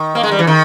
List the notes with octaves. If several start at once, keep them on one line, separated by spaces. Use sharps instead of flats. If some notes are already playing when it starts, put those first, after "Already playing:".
Already playing: D#3
A#3
G#3
G3
E3
D#3